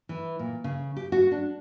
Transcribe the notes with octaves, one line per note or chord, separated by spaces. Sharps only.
E3
A#2
C#3
G4
F#4
D4